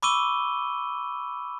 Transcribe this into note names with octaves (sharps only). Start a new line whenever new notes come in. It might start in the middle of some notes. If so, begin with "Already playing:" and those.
B5 C#6 D6 E6 D#7 G7